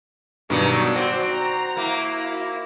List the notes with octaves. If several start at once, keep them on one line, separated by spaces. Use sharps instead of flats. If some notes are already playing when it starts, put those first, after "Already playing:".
G2 B2 D#3 F#3 D5 C#7
C4 F#4
A#5
A#3 E4